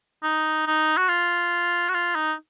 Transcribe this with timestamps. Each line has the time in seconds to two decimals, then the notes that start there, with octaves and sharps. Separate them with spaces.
0.23 D#4
0.66 D#4
0.97 F#4
1.08 F4
1.89 F#4
1.94 F4
2.15 D#4